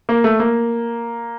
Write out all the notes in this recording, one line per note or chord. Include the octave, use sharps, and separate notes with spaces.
A#3
A3
A#3